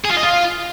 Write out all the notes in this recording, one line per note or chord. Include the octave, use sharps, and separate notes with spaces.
G#4
F4
D#5
F4